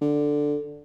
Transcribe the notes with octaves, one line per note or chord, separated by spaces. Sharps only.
D3